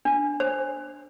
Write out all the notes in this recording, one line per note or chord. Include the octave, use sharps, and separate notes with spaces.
D4
C5